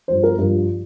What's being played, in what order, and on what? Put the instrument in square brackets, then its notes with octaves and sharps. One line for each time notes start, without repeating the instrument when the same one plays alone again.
[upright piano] G2 F3 C5
A#4
G2 F3